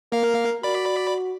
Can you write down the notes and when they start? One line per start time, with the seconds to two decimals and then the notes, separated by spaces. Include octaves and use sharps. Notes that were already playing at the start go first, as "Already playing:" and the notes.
0.12 A#3 A#4 F5
0.63 F#4 D5 B5